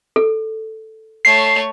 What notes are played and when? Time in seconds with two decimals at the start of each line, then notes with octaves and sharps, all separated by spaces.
0.16 A4
1.25 A3 C#5 C7